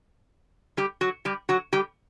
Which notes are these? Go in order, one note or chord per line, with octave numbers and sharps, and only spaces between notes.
G3 G4
F#3 F#4
G3 G4
F#3 F#4
G3 G4